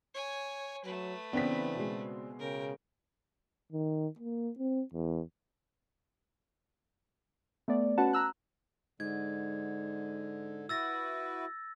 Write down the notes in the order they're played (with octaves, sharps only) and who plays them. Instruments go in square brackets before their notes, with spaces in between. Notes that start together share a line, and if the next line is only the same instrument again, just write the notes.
[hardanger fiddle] C#5 G#5
[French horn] F#3 [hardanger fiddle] A3 B4
[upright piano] C#3 C4 D4 [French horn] E3 [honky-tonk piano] B3 B6
[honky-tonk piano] B2 G#3
[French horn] C#3 [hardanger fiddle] A#4 G5
[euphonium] D#3
A#3
C4
E2
[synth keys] A3 B3 D5
C#4 F#4 B4 F#5 A5
A#5 E6 F#6
[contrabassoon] G#2 [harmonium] D3 [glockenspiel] G#6
[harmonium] E4 F#4 B4 [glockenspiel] E6 A6 A#6